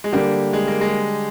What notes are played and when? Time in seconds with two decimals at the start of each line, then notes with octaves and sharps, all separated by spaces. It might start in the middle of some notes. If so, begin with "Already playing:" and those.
0.04 G#3
0.12 D3 G3 A#3 D4 G4
0.53 G#3
0.67 A#3
0.81 G#3